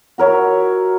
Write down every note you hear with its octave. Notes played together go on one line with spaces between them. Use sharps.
F#4 A#4 C#5 E5